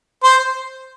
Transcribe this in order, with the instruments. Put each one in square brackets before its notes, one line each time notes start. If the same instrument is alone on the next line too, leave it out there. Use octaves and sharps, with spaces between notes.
[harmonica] C5